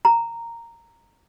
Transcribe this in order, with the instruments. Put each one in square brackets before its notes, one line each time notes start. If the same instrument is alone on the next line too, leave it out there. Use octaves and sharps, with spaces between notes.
[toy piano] A#5